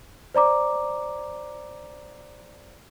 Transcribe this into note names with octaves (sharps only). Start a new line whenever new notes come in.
C5 D5 A#5 D6